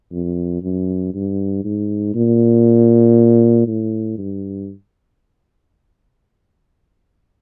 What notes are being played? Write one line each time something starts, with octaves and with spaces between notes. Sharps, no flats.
F2
F#2
G2
G#2
A#2
A2
G2